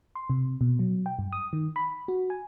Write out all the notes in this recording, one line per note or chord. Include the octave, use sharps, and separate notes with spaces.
C6
C3
B2
F#3
G5
G2
D#6
D#3
B5
F#4
G#5